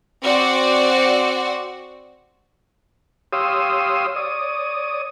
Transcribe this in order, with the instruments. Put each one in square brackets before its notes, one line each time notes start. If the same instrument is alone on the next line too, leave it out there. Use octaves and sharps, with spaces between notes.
[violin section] C4 F#4 C5 D5 F#5
[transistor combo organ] G4 C#5 F5 C6 D#6 E6
C#5 D5 D#6